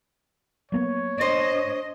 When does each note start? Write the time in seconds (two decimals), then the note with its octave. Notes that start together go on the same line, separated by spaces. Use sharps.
0.72 F#3 A#3 B3 C#5
1.21 D4 C5 D#5